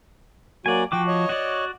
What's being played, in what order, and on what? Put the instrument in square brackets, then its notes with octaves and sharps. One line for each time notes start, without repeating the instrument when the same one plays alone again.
[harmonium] F#3 A#3 F#4 [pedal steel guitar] D5 G#5
[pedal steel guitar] F3 F#4 D6 [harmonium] G5
[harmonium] C#5 D#5
[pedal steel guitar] F#4 D5